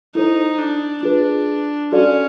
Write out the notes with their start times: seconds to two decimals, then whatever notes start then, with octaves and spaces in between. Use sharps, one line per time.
0.15 D#4 E4 A4 C5
0.58 D4
1.03 D4 F4 G#4 B4
1.92 C#4 F#4 A4 D5 F5